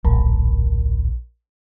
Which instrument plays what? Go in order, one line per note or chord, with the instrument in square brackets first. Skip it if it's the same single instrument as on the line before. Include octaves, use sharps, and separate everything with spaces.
[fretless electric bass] D1 [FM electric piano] A#1